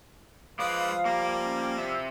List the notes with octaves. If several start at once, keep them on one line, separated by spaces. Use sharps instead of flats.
F3 G#3 B4 D5 F5 D#6
G3 A#3 A#4
C#4 G5
C3 E4 C5 E5 E6